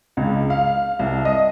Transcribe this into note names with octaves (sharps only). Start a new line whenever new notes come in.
C#2
F5
C2
D#5